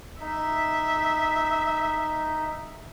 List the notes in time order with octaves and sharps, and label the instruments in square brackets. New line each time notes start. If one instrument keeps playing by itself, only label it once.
[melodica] D#4 [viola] E5